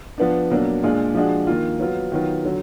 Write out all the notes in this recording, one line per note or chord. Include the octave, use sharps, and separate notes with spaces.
F3 B3 D4
B2 F#3 A#3 D4
A#2 G#3 D4 F4
F3 G#3 D4 F#4
D#3 A#3 F4
F#3 B3 F4
D#3 F#3 B3 F4
D3 F#3